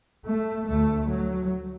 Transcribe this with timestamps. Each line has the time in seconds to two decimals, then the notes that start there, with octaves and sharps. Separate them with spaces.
0.25 A3
0.66 D2 A3
1.08 F#3